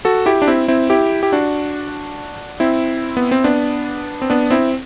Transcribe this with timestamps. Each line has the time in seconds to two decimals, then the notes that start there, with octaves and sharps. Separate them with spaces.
0.05 F#4 A4
0.26 E4 G4
0.42 D4
0.47 C4 E4
0.68 C4 E4
0.90 E4 G4
1.23 G4
1.32 D4 F#4
2.60 C4 E4
3.17 B3
3.31 C4
3.44 B3 D4
4.22 C4
4.30 B3 D4
4.51 C4 E4